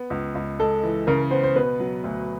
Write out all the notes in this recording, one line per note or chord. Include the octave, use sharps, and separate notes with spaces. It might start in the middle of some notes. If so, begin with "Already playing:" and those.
Already playing: B3
C#2
C#2
G#3 A4
E3
C#3 A#4
B3 C5
C5
B2 B4
F#3
D2